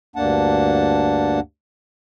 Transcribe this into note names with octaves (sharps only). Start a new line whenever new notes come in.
D2 G2 A#3 D4 F#5 A5